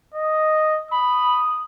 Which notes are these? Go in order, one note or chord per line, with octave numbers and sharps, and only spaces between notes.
D#5
B5 D#6